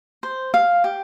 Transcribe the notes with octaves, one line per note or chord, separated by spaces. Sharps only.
C5
F5
G4